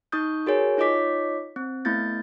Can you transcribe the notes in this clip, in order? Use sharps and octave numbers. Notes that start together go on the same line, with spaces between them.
D#4 C#6 D#6 G6
F#4 G#4 A#4 C#5 G#5
D#4 F4 C#5 D#5 D6 B6
C4
A3 B3 E4 G6 A6